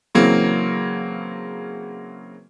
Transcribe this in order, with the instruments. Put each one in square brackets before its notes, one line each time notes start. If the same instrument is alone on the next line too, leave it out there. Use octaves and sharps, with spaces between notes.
[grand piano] C#3 E3 F#3 A#3 C4